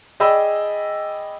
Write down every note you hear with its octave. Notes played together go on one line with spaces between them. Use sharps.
G#4 D5 D#5 G5 B5 E6